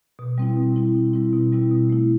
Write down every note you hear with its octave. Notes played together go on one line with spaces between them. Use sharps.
B2
G3 C4 E4
B2
G3 C4 E4
B2
G3 C4 E4
B2
G3 C4 E4
B2
A3 E4